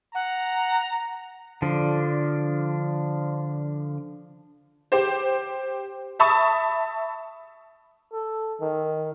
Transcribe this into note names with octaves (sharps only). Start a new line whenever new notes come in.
F#5 A#5
D3 F3 D4
G4 C5
E5 A5 B5 C#6 D#6
A4
D#3